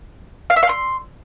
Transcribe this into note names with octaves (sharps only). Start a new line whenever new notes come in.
F5
E5
F5
C6